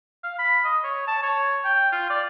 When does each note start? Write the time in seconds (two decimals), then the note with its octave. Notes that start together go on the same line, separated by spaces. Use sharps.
0.24 F5
0.39 B5
0.64 D#5
0.84 C#5
1.07 A5
1.23 C#5
1.65 G5
1.92 F4
2.10 D5